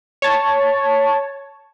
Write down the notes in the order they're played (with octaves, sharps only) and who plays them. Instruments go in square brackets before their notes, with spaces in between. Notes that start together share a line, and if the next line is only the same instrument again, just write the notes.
[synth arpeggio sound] C#5 A5